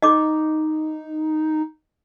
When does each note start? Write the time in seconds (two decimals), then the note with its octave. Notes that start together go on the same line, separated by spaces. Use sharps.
0.02 D#4 D#5 D6